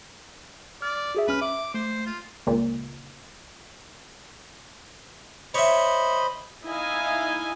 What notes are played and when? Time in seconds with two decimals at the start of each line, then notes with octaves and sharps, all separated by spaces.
0.82 D5 F6
1.15 F#4 G#4 E5
1.28 C2 C#4 B4 F6
1.41 E5 D6
1.74 A3 C5
2.06 F4
2.47 C#2 A#2
5.54 C5 C#5 D#5 E5 B5
6.65 D#4 E4 D#5 F5 G#5